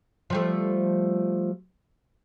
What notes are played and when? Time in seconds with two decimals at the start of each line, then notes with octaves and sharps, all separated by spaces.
0.30 F3 G3 A3